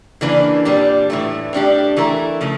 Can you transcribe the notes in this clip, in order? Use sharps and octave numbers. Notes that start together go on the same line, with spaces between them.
C#3 E3 A#3 D4
A#2 G3 D4
A2 E3 A3
A2 G3 D4 G4
E3 A3 E4 A#4
C#3 F3 A3